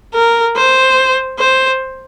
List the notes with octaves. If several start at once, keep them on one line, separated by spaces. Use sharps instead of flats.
A#4
C5
C5